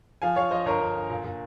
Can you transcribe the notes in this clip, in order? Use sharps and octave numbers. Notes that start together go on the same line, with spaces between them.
F3 F5 G#5
F3 C#5 F5
F3 C5 D#5
G1 A#4 C#5
G1
G1
A#2
A#2